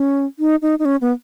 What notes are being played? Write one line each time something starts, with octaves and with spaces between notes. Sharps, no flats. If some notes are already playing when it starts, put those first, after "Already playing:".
Already playing: C#4
D#4
D#4
D#4
C#4
B3